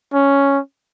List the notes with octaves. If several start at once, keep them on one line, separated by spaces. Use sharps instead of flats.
C#4